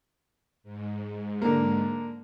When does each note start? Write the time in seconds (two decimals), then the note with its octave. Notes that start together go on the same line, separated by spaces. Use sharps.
0.63 G#2
1.42 D3 A#3